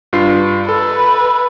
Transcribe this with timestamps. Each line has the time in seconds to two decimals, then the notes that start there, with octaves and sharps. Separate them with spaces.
0.13 G2 F4 C7
0.69 A4 B4